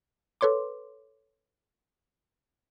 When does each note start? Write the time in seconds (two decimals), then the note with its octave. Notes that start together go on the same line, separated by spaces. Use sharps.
0.41 A4 B4 C#5 C6 D6